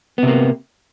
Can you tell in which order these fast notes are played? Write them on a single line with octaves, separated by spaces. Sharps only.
B3 C3 A#3